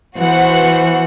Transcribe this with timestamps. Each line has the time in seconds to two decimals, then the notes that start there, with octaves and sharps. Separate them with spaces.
0.18 E3 B3 F#4 C5 F#5